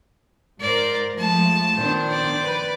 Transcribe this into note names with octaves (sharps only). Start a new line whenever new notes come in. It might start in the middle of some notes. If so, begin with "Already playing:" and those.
G#2 A#4 C5 D5
F3 G#3 A3 A5
A#2 D#3 B3 D4 C5
D5
B4